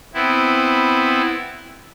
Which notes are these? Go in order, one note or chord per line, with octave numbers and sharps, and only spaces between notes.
B3 C4 E4